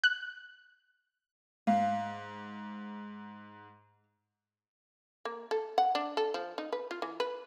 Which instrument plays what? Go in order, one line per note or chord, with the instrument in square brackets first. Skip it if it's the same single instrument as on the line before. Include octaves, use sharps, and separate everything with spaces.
[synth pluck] F#6
[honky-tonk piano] G#2 [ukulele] F5
[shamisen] A#3
A4
F#5
D4
A4
F3
D#4
B4
F4
E3
B4